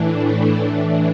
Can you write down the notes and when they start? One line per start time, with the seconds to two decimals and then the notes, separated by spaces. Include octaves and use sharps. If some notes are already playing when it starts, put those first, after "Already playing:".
Already playing: A2 E3 D4
0.17 A3
0.60 A2 E3 D4